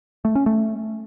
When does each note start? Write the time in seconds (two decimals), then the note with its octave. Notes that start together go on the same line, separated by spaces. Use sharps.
0.25 A3
0.35 C#4
0.46 A3